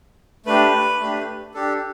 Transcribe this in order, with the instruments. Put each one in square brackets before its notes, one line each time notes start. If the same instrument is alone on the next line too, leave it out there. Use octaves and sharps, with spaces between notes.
[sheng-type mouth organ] A3 D4 G4 B4
A3 D4 G4
D4 G4 A4